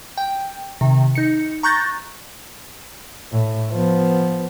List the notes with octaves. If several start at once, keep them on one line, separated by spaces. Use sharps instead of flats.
G5
C3 D#3
D#4 C#7
A#5 C#6 F#6 G6 A6 A#6
A2
F3 B3